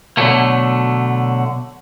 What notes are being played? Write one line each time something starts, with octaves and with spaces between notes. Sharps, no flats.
B2 D3 F3 F#3 A3 A#3